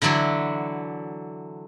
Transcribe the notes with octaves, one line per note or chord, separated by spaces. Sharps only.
D3 E3 F#3 D4 E4